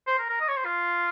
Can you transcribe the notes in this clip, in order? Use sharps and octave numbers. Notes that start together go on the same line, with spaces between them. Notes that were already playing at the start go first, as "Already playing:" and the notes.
C5
A#4
A#4
D#5
C#5
C5
F4